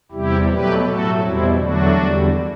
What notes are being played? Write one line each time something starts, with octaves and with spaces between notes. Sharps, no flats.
E2 C3 G3 E4 G4
B2 F#3 A3 G4 B4
A2 F#3 A3 F#4 A4
E2 B2 G3 C4 E4
E2 D3 F#3 A3 D4 F#4
E2 D3 G3